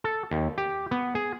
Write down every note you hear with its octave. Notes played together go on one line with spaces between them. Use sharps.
A4
D#2
G4
B3
G#4